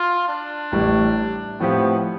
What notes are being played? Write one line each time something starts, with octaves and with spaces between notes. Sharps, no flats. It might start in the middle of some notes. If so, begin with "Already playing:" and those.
Already playing: F4
D4
A1 A2 G3
A2 F3 B3 C4 G4